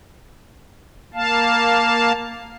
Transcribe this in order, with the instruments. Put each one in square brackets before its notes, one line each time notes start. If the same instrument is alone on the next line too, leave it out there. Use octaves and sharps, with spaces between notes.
[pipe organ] A#3 F5 A5